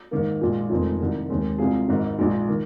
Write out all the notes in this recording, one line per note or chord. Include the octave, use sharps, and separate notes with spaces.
G#2 D#3 A#3
A#1 A#2 G#3
F1 F2 D#3 G#3 C4
C2 C3 D#3
D#2 D#3 G#3 C4
C2 C3 G#3 F4 G#4
G#1 G#2 D#3
A#1 A#2 G#3 D#4
D#3